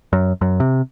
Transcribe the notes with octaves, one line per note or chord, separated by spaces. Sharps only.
F#2
F#2
C3